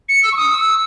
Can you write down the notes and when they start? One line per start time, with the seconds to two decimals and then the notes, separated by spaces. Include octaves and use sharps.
0.09 C#7
0.23 E6
0.32 C#6
0.37 D#6
0.50 E6